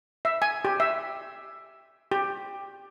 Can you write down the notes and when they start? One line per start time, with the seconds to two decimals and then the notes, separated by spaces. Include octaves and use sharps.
0.25 E5
0.42 G#5
0.65 G4
0.80 E5
2.12 G4